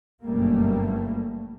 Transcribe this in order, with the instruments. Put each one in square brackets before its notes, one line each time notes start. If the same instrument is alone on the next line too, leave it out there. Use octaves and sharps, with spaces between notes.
[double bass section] G1 F#2 B2 G3 A3 A#3